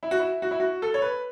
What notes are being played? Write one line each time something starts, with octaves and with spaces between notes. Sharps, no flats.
E4
F#4
E4
F#4
E4
F#4
A4
C#5
B4